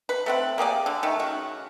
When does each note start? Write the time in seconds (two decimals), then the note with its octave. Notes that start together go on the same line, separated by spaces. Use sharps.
0.09 B4
0.26 A3 C4 F#5
0.58 A#3 G4 G#4 D5
0.86 D3
1.03 D#3 A3
1.19 C#3 F#4